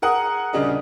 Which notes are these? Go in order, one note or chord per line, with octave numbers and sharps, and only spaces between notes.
G#4 A#4 F#5 D#6
D#1 C#3 D4 G#4 D#5